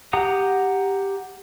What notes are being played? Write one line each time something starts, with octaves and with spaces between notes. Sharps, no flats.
G4 F#5 A#5 D#6